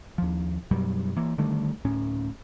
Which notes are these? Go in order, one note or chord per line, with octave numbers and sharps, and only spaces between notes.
D#2 F3
F#2 B2 F#3 G3
E3 A#3
D3 D#3 G3 A3
D1 A2 C#4